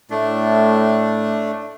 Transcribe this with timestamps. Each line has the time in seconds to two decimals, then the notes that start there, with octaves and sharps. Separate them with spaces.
0.10 A2 A3 D4